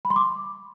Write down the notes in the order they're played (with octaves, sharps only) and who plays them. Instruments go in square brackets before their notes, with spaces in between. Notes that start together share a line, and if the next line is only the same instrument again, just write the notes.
[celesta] B5
C6
D6